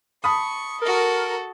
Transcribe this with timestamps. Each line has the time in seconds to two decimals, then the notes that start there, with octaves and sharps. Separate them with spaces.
0.24 A5 B5 C#6 D#6
0.82 F#4 A4 A#4